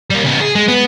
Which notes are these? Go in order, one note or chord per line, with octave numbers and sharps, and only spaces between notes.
G3 A#3
C#3 B3
G#4
G#3
B3